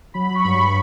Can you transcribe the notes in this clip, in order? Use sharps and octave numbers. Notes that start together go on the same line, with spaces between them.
F#3 B5
C#6
G2 B5